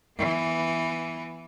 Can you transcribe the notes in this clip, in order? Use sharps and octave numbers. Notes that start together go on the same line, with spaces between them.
E3 B3